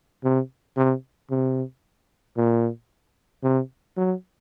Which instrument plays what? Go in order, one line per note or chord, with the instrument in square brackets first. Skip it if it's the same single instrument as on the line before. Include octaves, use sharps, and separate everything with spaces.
[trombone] C3
C3
C3
A#2
C3
F#3